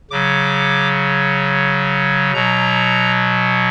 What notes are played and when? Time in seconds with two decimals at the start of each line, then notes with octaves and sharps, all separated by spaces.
0.11 C#3 F#3 D6
2.33 B2 F#3 A#5